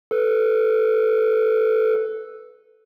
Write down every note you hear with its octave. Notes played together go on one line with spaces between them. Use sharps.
A4 B4